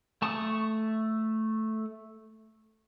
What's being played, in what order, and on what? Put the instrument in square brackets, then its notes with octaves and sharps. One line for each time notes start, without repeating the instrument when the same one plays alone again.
[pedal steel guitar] A3 A5 C#6 D#6